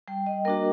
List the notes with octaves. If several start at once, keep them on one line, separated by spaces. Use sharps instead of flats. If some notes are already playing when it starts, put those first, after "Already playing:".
G3 G5
D#5
A#3 D4 F#4 A#4